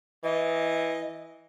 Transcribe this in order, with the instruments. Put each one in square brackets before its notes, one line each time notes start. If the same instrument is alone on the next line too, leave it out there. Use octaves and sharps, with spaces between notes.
[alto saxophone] E3 [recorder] D#5